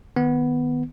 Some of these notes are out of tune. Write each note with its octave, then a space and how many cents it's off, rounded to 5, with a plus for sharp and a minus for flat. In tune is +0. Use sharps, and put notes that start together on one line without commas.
D#3 -15 B3 +0